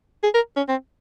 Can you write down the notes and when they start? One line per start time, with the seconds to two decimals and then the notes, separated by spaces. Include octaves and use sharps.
0.23 G#4
0.34 A#4
0.57 C#4
0.69 C4